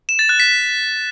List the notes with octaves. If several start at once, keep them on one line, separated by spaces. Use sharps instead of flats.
E7
A6
F#6
B6